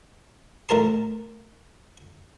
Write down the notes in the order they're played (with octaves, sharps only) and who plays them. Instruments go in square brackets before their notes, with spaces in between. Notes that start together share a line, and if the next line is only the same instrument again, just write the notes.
[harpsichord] A1 A3 A#4 A5 C6